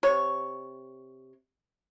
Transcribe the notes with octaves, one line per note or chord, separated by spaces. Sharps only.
C3 C#5